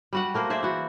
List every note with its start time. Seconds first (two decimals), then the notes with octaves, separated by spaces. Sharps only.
0.13 G3 F#4 F#5
0.34 A3 A#3 A#4 C5
0.50 G#4 C5 D5 E5
0.63 E3 F#4